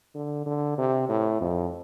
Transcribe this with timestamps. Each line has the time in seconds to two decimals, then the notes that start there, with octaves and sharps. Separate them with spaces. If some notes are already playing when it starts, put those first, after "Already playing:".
0.15 D3
0.46 D3
0.78 C3
1.09 A2
1.41 F2